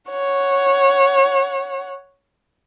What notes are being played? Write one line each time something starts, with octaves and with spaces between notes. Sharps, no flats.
C#5 F#5